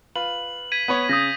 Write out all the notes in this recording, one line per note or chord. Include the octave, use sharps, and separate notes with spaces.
F4 B4 F#7
G#6 B6 D#7
B3 B4 C#5
C#3 D#6 G6 A#6